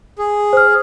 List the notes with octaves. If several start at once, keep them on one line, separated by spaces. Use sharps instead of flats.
G#4
C5 F6